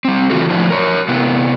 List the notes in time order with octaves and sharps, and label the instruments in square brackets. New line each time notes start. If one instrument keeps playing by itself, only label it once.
[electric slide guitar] G3 C4
A2 C#3 E3 F4 F#4 A4
A2 F3 D4 E4
A#4 C#5
C3 B3 E4